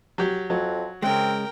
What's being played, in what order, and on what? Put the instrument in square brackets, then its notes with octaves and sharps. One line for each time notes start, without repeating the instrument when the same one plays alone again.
[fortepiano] F#3 G4
[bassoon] F2 [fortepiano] F#3
[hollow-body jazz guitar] C#3 G#3 [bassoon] C4 [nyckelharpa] A#4 G5